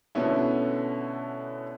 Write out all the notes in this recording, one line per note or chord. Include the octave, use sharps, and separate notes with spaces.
B2 D3 A3 B3 C#4 E4